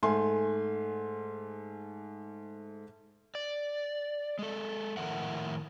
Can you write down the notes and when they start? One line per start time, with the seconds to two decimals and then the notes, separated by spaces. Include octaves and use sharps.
0.03 G#2 A3 G#5 C6
3.35 D5
4.39 G#3 A4
4.97 A2 D#3 F3 A#4 E5 F#5